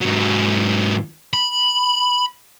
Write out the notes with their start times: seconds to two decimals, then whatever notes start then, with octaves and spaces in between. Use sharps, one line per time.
0.01 G#2 F#3
1.34 B5